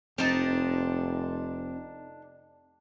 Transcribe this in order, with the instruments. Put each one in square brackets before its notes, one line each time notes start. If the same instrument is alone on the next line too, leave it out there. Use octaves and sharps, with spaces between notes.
[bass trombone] F1 [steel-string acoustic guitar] C4 [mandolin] D4 D#4 A5